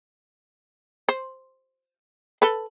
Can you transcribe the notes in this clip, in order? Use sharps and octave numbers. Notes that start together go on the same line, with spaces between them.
C5
A4 B4